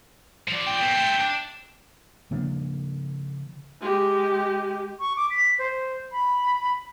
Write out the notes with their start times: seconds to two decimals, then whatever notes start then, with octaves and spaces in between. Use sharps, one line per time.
0.48 F3 D5
0.67 G5
0.80 B2
0.94 A3 C4
1.20 D4
2.31 C#3 F3 A#3 D4
3.82 G#3 G4
5.00 C#6
5.17 D6
5.30 B6
5.59 C5
6.12 B5